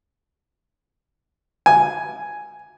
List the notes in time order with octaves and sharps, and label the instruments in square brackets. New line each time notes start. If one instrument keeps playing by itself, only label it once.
[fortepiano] G#5